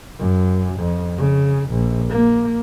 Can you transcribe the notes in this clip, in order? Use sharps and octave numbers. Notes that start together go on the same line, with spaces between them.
F#2
F2
C#3
A#1
A#3